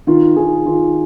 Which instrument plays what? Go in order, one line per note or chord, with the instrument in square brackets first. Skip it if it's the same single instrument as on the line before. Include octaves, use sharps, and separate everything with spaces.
[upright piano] D#3 F4
D#3 G#4
D#3 F4